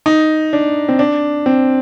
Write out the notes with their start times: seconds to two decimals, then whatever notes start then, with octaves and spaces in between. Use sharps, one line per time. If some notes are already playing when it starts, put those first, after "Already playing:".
0.06 D#4
0.53 D4
0.89 C4
0.99 D4
1.46 C4